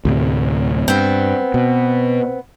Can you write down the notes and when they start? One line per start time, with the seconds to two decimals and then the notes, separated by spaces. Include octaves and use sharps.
0.05 D2 A2 C3
0.88 G2 B3 C4
1.54 B2